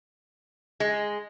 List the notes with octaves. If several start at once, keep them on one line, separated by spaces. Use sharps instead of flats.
G#3